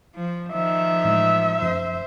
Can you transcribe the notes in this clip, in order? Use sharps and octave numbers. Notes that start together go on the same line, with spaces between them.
F3
D#3 F3 E5
A2 E3 G#3
F1 F#2 F3 C5